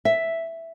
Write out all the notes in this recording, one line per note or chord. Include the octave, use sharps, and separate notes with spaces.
E5